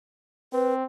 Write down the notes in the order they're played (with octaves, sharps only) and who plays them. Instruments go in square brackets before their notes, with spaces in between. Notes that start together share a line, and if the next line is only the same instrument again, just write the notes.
[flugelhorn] C4 [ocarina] B4